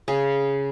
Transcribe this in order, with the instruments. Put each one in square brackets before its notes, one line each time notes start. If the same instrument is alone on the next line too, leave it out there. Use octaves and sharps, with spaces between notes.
[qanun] C#3 [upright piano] G#4